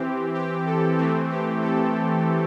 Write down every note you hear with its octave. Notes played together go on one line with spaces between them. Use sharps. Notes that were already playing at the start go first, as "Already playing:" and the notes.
Already playing: E3 C4 G4
G4
A4
E3 A3 C4 G4
G4
A4